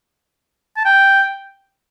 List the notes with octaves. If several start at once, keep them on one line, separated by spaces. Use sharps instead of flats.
A5
G5